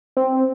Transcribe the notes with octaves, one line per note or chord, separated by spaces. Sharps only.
C4